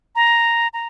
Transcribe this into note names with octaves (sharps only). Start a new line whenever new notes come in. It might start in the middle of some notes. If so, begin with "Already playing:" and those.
A#5
A#5